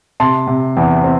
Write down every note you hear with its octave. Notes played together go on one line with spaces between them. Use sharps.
C3 A5 C6
C3
E2
C4